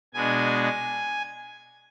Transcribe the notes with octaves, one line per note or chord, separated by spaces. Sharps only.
B2 G#3 D4 G#5